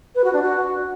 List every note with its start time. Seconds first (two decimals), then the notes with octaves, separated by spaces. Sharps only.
0.15 B4
0.24 F#4
0.33 D4
0.42 F#4